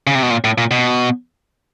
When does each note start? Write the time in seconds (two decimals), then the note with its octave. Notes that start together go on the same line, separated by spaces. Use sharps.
0.07 C#3
0.15 C3
0.23 B2
0.30 A#2
0.44 A2
0.58 A#2
0.71 B2